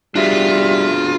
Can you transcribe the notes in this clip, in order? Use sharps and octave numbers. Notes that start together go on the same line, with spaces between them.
G3 D4 F4 F#4 G#4 E5